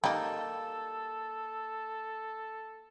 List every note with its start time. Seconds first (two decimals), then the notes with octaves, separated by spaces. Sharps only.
0.04 G3 A#3 D#4 A4